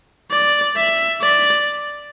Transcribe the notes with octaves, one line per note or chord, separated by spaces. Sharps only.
D5
E5
D5